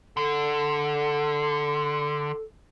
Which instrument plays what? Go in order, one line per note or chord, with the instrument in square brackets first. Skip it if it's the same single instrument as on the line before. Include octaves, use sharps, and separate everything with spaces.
[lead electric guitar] D3 [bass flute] A4